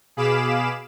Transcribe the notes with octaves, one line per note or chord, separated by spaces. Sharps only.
B2 G#4 F5 B5 D6 E7